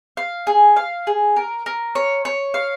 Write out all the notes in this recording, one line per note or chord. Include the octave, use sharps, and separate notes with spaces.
F5
G#4
F5
G#4
A#4
A#4
C#5
C#5
F5